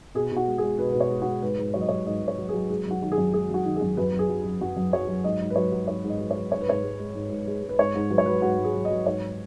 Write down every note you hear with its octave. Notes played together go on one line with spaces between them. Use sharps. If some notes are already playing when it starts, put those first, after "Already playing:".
B2 G#4
B2
F#4
G#3
G#4
G#3
B2 B4
B2 B4
C#5
G#3
F#4
G#3
G#2 B4
G#2
F#3 C#5
D#5
F#3 C#5
G#2 D#5
G#2
C#5
F#3
G#4
F#3
G#3 G#4
F#2
F#4
D#3 F#4
G#4
F#2
G#3 G#4
F#2 F#4
D#3
G#4
F#2
F#2 B4
F#2
G#4
F#3
F#3
F#2 F#4
F#2
F#3 C#5
F#3
G#2 D#5
G#2
B4
F#3 C#5
F#3
G#2 C#5
G#2
D#5
F#3
C#5
F#3
G#2 C#5
B4
G#2 C#5
G#3
G#3
G#2
G#2
G#3
G#3
B4
G#2 C#5
G#2
F#3 B4
C#5
F#3 B4
G#2 F#4
G#2
G#4
F#3
D#5
F#3
G#2 C#5